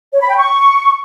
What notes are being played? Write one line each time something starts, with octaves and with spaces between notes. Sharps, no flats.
C#5
B5
G5
C#6